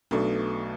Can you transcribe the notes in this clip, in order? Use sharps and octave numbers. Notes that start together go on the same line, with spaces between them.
B1 B2 A3 D4